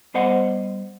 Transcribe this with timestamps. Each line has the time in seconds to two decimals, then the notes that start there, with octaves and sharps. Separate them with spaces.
0.14 G3 B3 C5 D#5 F#5